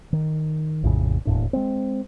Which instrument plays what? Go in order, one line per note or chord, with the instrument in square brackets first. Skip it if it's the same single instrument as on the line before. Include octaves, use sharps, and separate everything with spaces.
[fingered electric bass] D#3
A#1 F2 A2 C#3
E1 D#2 A2 D4
G#3 B3 C4